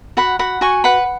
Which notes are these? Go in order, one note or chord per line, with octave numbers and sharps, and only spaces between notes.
F#4 F#5 B5
F#4 F#5 B5
F#4 G#5 C#6
B4 F#5 B5